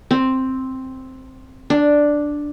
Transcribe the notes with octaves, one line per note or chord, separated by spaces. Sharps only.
C4
D4